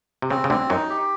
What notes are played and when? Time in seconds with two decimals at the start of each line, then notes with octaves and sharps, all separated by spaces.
0.22 C3
0.30 C#3 C4
0.44 C#3
0.50 D2 D3 C4
0.70 F#2 F#3 D#4
0.90 G4